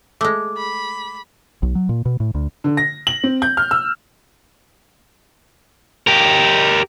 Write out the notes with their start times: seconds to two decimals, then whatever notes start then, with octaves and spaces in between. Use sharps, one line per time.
0.21 G#3 A3 D6
0.58 B5
1.63 B1
1.75 F#3
1.89 A#2
2.05 B2
2.20 A2
2.35 D2
2.64 D3
2.77 A#6
3.07 F#7
3.24 C4
3.42 G6
3.57 F6
3.71 E6
6.07 G4 A#4